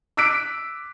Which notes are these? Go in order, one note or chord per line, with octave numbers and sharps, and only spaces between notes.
D6 E6 F#6 B6 D7